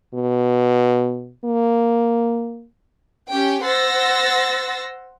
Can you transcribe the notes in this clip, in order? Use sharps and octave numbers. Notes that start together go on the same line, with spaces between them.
B2
A#3
C#4 G4 G5
C5 F#5 C6 E6 A6 A#6